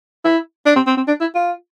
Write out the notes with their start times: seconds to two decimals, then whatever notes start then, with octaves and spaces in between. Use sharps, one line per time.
0.25 E4
0.66 D4
0.76 C4
0.87 C4
0.97 C4
1.08 D4
1.21 E4
1.35 F4